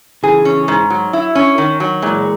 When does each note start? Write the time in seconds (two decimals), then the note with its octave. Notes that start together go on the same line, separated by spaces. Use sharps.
0.23 C#3 E3 G#4
0.45 C#4
0.68 G#2
0.90 F#3
1.13 E4
1.35 C#4
1.58 D#3
1.80 F#3
2.02 A#2 E3 G#3